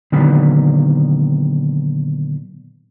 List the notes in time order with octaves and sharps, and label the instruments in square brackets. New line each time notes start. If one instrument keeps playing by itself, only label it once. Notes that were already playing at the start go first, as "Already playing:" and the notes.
[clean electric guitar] A#2 D3 D#3 F#3 B3